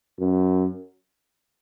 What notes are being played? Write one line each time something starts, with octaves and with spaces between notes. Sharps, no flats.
F#2